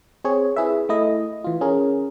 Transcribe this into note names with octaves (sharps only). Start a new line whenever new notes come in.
C4 G#4 C#5
E4 G#4 B4 E5
A3 E4 D#5
E3 F4
C#4 G#4 A#4